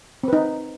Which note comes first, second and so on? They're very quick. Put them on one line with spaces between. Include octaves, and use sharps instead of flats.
C4 B4 D#4